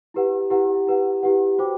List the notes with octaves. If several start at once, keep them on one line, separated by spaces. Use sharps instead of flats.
E4 G4 B4 F#5
E4 G4 B4 F#5
E4 G4 B4 F#5
E4 G4 B4 F#5
F#4 C5 G5 D6